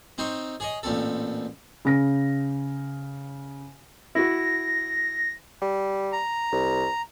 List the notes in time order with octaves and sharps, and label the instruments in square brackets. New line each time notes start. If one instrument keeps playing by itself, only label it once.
[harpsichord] C4 D#4 C5 C#5
G#4 C#5 D#5
A1 A#2 C4 A4
[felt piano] C#3 A#6
[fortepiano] E4 F#4 [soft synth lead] A#6
[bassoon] G3
[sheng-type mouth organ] A#5
[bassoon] C2